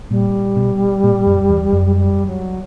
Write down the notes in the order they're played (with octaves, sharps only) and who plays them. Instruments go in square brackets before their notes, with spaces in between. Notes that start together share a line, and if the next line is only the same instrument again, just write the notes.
[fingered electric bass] A#2 [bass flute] G3
[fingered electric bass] B2
A#2
F#2
E2
F#2
[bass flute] G3
F#3